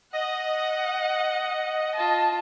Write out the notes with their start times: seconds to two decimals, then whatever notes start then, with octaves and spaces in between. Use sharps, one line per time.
0.13 D#5 F#5
1.95 F4 A5